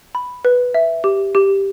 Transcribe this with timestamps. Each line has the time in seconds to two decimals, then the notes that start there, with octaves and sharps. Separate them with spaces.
0.15 B5
0.45 B4
0.74 E5
1.04 G4
1.35 G4